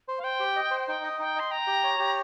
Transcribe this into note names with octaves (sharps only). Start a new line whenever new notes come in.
C5
F5
C5 G5
G4
D#5
C5
D#4 G5
D#5
D#4 G5
D#5 C6
G5 A#5
G4
C#5
G4